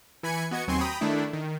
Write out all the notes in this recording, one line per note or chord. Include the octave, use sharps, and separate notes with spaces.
E3 G#5 B5 G#6 C#7
B3 F#4 D#5 G#6 C#7
D#2 F#3 C4 G#5 C6 C#6
G5 A#5 B5 D#6
D#3 A3 D4 E4
D#3